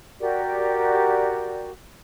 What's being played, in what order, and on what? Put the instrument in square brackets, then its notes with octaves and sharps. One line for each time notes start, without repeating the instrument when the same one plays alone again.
[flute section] F#4 G4 A#4 D5